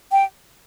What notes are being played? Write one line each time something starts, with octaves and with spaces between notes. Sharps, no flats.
G5